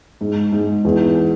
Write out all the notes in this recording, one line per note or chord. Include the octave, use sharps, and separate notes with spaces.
G#2
G#2
E2